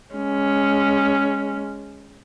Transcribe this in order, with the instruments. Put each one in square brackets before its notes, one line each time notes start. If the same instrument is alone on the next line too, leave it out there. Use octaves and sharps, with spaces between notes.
[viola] G#3 C#4